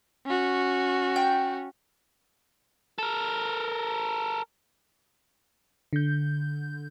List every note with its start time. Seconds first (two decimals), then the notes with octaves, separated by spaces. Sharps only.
0.26 C#4 F#4
1.16 G5
2.98 A4 A#4
5.93 D3 G6